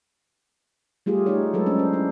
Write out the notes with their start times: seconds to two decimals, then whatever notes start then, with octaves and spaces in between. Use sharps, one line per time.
1.06 G3 A3 F4 G4 G#4
1.26 A3 D#4 G#4 C#5
1.53 F#3 G#3 A4 B4
1.66 C#4 D4 C5
1.79 C5
1.93 D4 E4